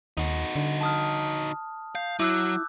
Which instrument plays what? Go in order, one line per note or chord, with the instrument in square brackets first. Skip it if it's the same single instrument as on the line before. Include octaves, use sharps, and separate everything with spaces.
[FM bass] D#2 [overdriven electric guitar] D#4 F#4
[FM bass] D3
[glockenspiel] A5 D#6 F6
[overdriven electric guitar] F5 [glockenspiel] G6
[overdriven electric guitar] F#3 [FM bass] E4 [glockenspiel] D6 E6 F#6